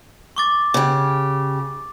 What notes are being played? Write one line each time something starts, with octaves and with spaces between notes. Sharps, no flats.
C#6 D6 A6
C#3 G4